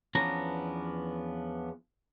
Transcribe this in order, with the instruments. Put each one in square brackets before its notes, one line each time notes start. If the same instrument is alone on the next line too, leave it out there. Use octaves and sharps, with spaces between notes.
[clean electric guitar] E2 F3 B3 C#4 D4 A#5